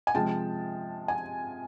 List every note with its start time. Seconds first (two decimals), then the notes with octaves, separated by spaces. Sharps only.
0.07 G#5
0.15 C3 F3 G#3 G5 A5
1.08 G#5